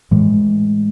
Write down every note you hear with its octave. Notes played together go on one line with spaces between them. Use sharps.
A2 E3 G#3